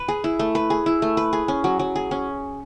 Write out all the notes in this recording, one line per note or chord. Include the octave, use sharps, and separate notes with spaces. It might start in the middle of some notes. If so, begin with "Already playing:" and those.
Already playing: B4
G#4
E4
A3
B4
G#4
E4
A3
B4
G#4
C#4
F#3
F#3
G#4
C#4